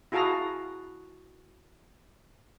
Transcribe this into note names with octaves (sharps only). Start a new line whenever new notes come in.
E4 F#4 G#4 F5 A5 A#5